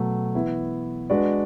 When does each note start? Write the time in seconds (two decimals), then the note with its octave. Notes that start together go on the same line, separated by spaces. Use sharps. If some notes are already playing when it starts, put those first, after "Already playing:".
Already playing: B2 F#3 A3
0.35 E3 B3 E4
1.10 G#3 D4 F#4 B4 D5